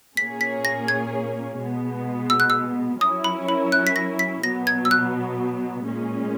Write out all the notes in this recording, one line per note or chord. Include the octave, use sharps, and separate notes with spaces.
A#2 A#3 C#4 G#4 C#5 B6
B6
A#6
G#6
B2 G#3 B3
E6
F#6
E6
F#3 C#4 E4 A#4 C#5 D#6
B5
B5
F#6
B6
A#6
B6
B2 F#3 B3 A#6
G#6
E6
F#6
A#2 G#3 C#4